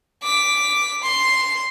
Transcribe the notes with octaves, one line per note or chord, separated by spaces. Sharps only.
D6 B6
C6